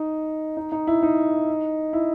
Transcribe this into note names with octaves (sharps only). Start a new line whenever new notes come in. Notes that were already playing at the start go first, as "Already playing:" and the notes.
Already playing: D#4
D#4
D#4
E4
D#4
E4